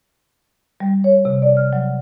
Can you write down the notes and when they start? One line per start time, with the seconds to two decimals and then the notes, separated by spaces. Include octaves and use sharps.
0.80 G3
1.04 C#5
1.25 C3
1.42 D5
1.57 F6
1.73 F#3